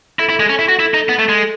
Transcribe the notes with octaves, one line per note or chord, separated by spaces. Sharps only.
E4 A4
E4
G#3
C#4
E4
F#4
E4 A4
D#4 A4
B3 A4
A3
G#3